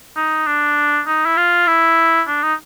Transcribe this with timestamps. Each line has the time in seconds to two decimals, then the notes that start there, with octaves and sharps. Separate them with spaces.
0.16 D#4
0.47 D4
1.07 D#4
1.26 E4
1.37 F4
1.68 E4
2.28 D4
2.43 D#4